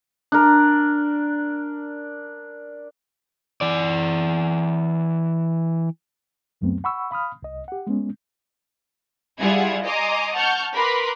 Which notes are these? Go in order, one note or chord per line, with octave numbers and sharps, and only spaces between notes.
D4 A#4
E3 D5
C#2 F#2 F#3 A3 B3 C4
F#5 B5 C#6 E6
F5 B5 D#6 F6
C2 D#5
G4 F#5
G#3 B3 C#4
G3 E4 F4 G#4 F#5 G#6
D#5 G#5 A#5 C6 D6 D#6
F#5 A5 C#6 F6 G6
A#4 B4 B5 C6 D6